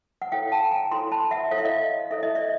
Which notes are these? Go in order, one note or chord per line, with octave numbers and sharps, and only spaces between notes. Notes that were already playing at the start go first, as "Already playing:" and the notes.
F#5
E4 A4 C#5 F5 G5
G5 A5
G#5 A#5
E4 A4 C#5 A#5 C6
A5 B5
E5 F#5
E4 A4 C#5 F5
E5
D#5 F5
E4 A4 C#5 E5
D#5
D5 E5